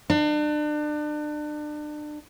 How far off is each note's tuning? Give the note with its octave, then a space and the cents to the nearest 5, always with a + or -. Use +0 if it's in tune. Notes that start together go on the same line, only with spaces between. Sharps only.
D4 +35